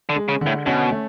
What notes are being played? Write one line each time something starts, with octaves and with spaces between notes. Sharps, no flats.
D3
G#3
C#3
D3
A2
B2 C#4
A3